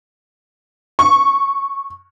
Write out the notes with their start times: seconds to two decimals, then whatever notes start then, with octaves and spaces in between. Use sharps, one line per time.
0.99 C#6